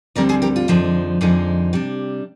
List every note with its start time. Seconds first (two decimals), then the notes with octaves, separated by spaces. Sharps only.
0.15 D2 D3 G3 C4 A#4 D5
0.29 G#4 C5
0.42 G4 A#4
0.56 F4
0.68 F2 D3 F3 G#3 D#4
1.21 F2 D3 F3 G#3 D#4
1.73 C3 G3 D4